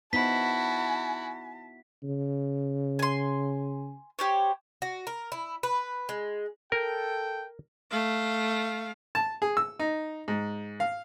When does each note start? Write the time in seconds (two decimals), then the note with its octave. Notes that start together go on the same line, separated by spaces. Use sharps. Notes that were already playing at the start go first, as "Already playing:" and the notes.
0.13 B3 D#4 E4 F#4 C5 A5 B6
2.03 C#3
2.99 G#5 C6
4.19 G4 C5 C#5
4.82 F#4
5.07 A#4
5.32 E4
5.63 B4
6.09 G#3
6.72 A4 A#4 G5
7.91 A3 F5
9.15 A5
9.42 G#4
9.57 E6
9.79 D#4
10.28 G#2
10.80 F5